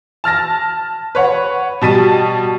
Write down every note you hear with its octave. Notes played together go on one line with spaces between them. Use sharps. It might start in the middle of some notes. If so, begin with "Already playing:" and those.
A5 F6 A6 A#6
B4 C#5 F#5
B2 G3 A5 A6 B6 D#7